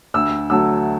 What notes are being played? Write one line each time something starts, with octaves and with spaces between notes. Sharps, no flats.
D2 E6
D3 F#3 A3 E6